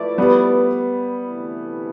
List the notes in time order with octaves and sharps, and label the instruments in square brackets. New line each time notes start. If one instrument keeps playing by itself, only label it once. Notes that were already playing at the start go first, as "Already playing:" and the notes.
Already playing: [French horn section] F3 A3 E4 B4 D5
[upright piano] G3 B3
[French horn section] D2 C3 E3 A3 E4